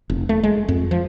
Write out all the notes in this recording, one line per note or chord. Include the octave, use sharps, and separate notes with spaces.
F1
A3
G#3
F2
F3